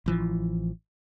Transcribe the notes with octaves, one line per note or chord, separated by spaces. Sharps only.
A1 E3 F3